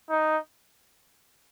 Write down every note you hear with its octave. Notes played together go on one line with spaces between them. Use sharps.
D#4